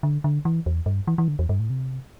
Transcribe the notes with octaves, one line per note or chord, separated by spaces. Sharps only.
D3
D3
E3
E2
G2
E3
E3
D3
E2
G2
A2
C3